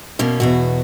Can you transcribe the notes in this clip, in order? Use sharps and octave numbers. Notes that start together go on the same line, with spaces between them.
E2 B2 A#3 C#4
E2 B2 F#4